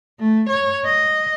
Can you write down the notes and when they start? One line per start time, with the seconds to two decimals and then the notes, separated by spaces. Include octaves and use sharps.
0.19 A3
0.49 C#5
0.85 D#5